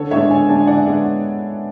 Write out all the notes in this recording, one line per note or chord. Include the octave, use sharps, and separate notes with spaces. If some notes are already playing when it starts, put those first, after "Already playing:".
Already playing: D3 A4 C#5
G#3 B3 D4 C#5 E5
D3 E5 G#5
G#3 B3 D4 A5
G#5
D3 D5 F#5
G#3 B3 D4